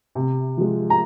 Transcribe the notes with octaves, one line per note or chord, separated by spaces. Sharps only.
C3
F3 G#3
A#5